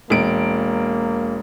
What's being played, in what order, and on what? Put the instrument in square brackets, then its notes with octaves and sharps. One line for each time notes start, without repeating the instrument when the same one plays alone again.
[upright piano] E1 D7 [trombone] A#3